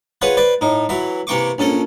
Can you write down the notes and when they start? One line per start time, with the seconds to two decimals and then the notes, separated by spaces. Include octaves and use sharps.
0.22 F4 G#4 B4 C#5 F#5
0.37 B4 C5 D5
0.61 A2 D#4
0.89 E3 F#3 E5
1.27 C3 E3 A#3 G5 C#6 D6
1.58 A#1 C#4 A4 A#4